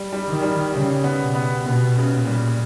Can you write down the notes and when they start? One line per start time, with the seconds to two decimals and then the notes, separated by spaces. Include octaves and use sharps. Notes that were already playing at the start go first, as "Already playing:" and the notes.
Already playing: G3
0.13 G3
0.28 D#3
0.42 G3
0.73 C#3 G3
1.04 B3
1.20 B2
1.35 B3
1.66 B2 B3
1.95 C#3
2.12 A#2
2.27 G3